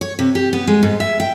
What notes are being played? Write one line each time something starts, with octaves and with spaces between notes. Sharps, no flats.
C#5
C3
G4
B3
G#3
G#2
E5
G5